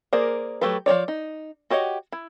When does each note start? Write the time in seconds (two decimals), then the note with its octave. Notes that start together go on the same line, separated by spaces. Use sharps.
0.13 A#3 G#4 A#4 C5 D5
0.61 F#3 A3 G4 A4 B4
0.86 F3 F#3 C#5 D5
1.08 D#4
1.70 F#4 G4 C#5 D#5 F#5
2.12 E4